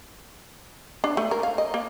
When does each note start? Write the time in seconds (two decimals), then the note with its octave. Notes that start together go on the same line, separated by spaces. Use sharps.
1.04 D4
1.17 A3
1.31 A#4
1.43 F5
1.58 D#5
1.74 A#3